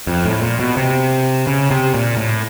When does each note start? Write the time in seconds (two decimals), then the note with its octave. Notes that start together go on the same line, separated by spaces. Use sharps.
0.07 F2
0.25 A2
0.42 A#2
0.60 B2
0.77 C3
1.47 C#3
1.71 C3
1.94 A#2
2.17 A2